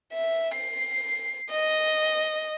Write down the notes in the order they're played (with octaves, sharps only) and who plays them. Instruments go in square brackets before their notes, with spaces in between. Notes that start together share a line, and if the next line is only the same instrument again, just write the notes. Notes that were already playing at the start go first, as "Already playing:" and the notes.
[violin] E5
C7
D#5